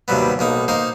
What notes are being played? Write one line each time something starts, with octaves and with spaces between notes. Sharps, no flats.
D#2 C3 F#3 G3 B3
B1 A#3 D#4
A#3 D#4 C5